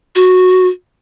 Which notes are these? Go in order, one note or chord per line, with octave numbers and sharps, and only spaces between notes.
F#4